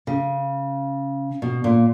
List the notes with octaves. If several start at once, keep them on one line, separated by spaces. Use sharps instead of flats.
C#3
B2
A#2